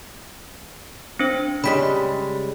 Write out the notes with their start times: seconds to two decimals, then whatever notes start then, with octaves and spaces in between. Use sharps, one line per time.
1.19 C4 D4 C5
1.64 C#3 G3 G#3 B5 B6